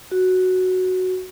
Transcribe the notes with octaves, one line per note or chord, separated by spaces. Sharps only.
F#4